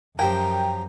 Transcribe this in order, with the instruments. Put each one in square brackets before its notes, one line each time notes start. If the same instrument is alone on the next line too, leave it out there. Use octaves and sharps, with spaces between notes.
[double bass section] F#2 [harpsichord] F3 G4 A#4 [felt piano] G5 [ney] A#5